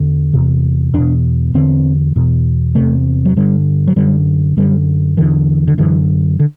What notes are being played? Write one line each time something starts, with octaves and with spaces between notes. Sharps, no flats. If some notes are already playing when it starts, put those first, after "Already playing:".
Already playing: E2 D3
E2 C3
E2 B2 D4
E2 D3 C4
E2 B2
E2 C3 A3
F#3
G2 D3 G3
F#3
F#2 D3 G3
F#2 D3 G3
E2 D3 E3
D3
F#2 D3 E3
D3